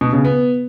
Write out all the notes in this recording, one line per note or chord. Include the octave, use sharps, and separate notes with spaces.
B2
C#3
B3